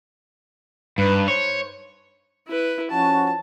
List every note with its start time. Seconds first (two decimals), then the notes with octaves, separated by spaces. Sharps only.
0.98 G2 D#4 B4
1.28 C5 C#5
2.48 E4 B4
2.91 F3 C#4 F#4 A5